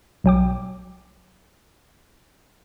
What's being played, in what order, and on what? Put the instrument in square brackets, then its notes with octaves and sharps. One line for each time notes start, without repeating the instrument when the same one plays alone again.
[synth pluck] B1 F#3 G5 D6